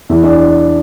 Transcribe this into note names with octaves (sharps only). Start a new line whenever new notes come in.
E2 E3 E4
D4